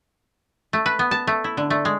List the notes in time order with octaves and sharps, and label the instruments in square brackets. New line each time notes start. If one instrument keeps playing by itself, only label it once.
[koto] A3
B4
B3
A5
A3
E4
D3
A3
G#3